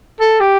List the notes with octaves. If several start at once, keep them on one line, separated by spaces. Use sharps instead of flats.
A4
G4